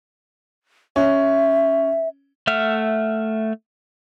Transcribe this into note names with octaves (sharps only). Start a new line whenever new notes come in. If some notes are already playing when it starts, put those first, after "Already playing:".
C#4 E5
A3 E5 F#5 F6